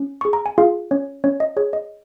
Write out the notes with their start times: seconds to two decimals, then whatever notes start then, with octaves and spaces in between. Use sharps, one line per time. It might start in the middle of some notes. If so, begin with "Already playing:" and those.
Already playing: C#4
0.21 G#4 C#6
0.33 A#5
0.46 G#5
0.58 F4 G#4 F5
0.91 C#4 C#5
1.24 C#4 C#5
1.40 D#5
1.57 G#4 C#5
1.73 D#5